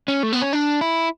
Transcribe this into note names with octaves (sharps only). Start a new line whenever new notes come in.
C#4
A3
B3
C#4
D4
E4